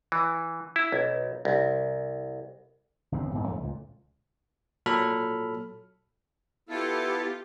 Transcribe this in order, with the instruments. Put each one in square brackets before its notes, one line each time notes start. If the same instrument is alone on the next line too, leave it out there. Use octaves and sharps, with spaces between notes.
[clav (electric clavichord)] E3
E4
B1
C2
[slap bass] G1 E2 C#3 C4
E1 D2 G#2 C4
F2 F3 G3 A3
C#2 A#2
[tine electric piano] A#2 F#3 A4 B5 F6
[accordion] B3 E4 A4 [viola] F4 G4